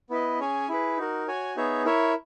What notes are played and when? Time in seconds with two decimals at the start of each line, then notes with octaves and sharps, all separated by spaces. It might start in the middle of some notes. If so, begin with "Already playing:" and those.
0.10 B3 E4 B4 D#5
0.39 C#4 G#4 C#5 G#5
0.69 E4 G#4 B4
0.97 D#4 F#4 A#4
1.27 F#4 C#5 G#5
1.56 B3 D#4 G#4 C#5 E5
1.85 E4 A#4 C#5 E5